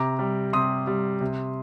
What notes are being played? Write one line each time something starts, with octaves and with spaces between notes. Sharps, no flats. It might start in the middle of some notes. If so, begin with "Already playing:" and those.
Already playing: C3 A#5 D6
G3
C3 C6 D#6
G3
C3